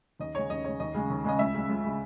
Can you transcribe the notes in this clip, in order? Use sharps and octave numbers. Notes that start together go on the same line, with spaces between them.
D#2 D#5
C#3 G#3 C#5
D#2 D#5
C#3 G#3 C#5
D#2 D#5
C#3 G#3
D#2
C#3 G#3 D#5
C#2 E5
C#3 G#3
C#2
C#3 G#3